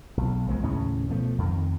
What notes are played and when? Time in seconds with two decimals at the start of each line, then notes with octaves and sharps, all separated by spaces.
0.17 B1
0.47 B1 F3 G#3
0.63 D#2 A2 C#3 C#4
1.09 B2 F3 A3
1.38 F2 D#3